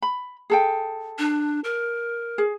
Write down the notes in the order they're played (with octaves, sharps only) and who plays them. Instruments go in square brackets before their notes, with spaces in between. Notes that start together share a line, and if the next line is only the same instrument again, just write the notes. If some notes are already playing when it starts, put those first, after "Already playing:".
[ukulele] B5
G#4 A4 G5
[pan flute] D4
A#4
[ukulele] G#4